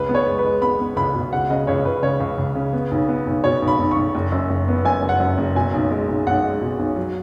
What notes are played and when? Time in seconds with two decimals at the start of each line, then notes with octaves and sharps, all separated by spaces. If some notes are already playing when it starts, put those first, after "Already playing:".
Already playing: C#2 B4
0.09 B3
0.15 C#5
0.26 G#3
0.39 B4
0.44 G#3
0.62 B3 B5
0.80 B3
0.96 C#2 B5
1.14 B2
1.33 C#2 F#5
1.50 C#3 D#5
1.67 C#2 C#5
1.84 C#2 B4
2.02 C#3 C#5
2.20 C#2
2.38 C#2
2.55 C#3
2.73 B3
2.91 B1
3.08 B3
3.26 B1
3.44 B2 C#5
3.62 B1
3.68 B5
3.79 B1
3.91 B1 C#6
4.15 F#1
4.32 F#2
4.50 F#1
4.68 B3
4.85 F#2 G#5
5.02 F#1
5.09 F#5
5.20 F#2
5.38 F#1
5.55 B2 G#5
5.74 B1
5.91 G#3
6.08 B1
6.27 B1 F#5
6.44 G#3
6.61 B2
6.79 B1
6.96 F#3